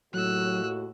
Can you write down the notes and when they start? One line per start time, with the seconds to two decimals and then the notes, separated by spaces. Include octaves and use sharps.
0.14 D#2 A2 F#3 F#4 E6 F#6